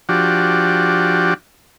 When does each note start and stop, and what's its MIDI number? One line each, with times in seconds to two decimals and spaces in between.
0.09 1.34 53
0.09 1.34 62
0.09 1.34 66
0.09 1.34 67